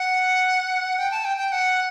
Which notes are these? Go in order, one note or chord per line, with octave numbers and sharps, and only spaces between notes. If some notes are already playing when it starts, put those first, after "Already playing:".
Already playing: F#5
G5
A5
G5
G5
F#5